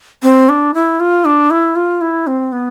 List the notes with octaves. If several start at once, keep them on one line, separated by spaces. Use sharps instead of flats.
C4
D4
E4
F4
D4
E4
F4
E4
C4
B3